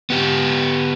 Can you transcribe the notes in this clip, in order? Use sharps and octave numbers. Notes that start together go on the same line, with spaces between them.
B3 G4